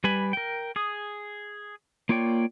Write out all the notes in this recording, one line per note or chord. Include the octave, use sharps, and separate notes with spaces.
G3 B4 G#5 B5
A#4 G5
G#4 D#6
A#3 F4 C#5 D5 G5